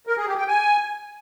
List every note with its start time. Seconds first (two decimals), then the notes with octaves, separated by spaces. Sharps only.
0.07 A#4
0.17 G#4
0.27 G4
0.38 G5
0.48 G#5